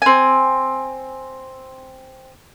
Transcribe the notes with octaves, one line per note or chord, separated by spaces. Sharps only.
C4 G#5